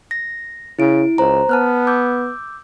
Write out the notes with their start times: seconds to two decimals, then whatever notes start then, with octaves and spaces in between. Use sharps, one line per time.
0.11 A#6
0.79 C#3 E4 D7
1.18 C#2 C5 A#5
1.49 B3 A5 F6 F#6
1.87 D6 E6 G6